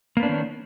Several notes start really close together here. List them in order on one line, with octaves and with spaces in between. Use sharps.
A#3 B3 D4 C#4 D#3